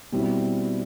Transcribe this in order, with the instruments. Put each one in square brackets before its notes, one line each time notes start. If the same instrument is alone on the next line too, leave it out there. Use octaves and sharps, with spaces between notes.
[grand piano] B2 G3 C4 E4